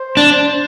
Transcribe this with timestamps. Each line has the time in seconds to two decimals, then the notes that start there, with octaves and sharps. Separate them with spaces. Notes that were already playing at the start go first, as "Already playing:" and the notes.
Already playing: C5
0.17 D4